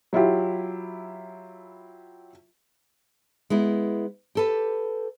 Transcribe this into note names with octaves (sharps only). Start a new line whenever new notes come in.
F#3 E4 F4 G4
G#3 B3 E4
G4 A4 B4